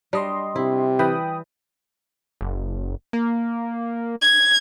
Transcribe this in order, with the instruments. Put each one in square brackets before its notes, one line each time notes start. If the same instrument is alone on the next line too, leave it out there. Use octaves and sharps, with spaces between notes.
[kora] G3 [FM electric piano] D4 D#5 C6
[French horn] C3 [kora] E4
[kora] E3 [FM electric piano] G5 B5 D#6
[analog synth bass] F#1
A#3
[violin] G#6